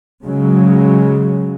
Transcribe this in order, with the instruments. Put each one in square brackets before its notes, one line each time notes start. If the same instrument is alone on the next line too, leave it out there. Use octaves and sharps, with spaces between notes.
[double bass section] C#3 F#3 G#3